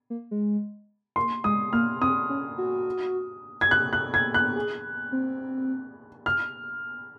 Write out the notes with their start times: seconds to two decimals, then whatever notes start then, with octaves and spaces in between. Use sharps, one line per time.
0.10 A#3
0.31 G#3
1.16 A#3 C6
1.44 G#3 D#6
1.73 A#3 F6
2.01 C4 D#6
2.30 C#4
2.58 F#4
3.61 G#6
3.71 F#6
3.93 F#6
4.14 G#6
4.34 F#6
4.56 G#4
5.12 C4
6.26 F6